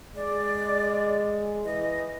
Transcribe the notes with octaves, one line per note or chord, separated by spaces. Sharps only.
G#3 D5
E3 D#5